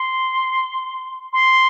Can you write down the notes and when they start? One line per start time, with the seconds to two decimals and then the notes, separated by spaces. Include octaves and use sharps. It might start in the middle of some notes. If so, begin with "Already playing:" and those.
Already playing: C6
1.33 C6